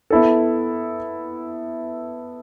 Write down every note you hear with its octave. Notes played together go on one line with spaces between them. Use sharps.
B3 E4 A4